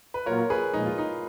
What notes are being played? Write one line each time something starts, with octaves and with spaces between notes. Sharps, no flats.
B4
A#2 F#3 A#3 F4 A#4 C#5
G#4 B4
A#2 F3 G#3 D#4
F4
D#4